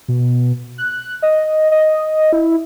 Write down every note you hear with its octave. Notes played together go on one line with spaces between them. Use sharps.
B2
F#6
D#5
D#5
E4